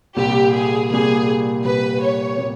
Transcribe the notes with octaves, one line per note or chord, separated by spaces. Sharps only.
C2 A#2 G3 G4
G#4
C2 A#2 G3 G#4
C2 A#2 G3 B4
C#5
A#2 G3